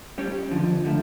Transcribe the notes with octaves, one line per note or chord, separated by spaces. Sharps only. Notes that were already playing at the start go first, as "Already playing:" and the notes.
G3 C#4 G4 C#5
F2 D3 F3
D3 F3 A3